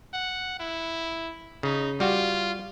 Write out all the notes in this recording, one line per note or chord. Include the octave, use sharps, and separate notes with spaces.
F#5
E4
C#3 D#4
G3 F4 F#4